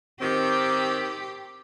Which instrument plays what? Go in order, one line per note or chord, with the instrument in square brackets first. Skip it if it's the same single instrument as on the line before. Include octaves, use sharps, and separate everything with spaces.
[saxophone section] D#3 C4 [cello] G4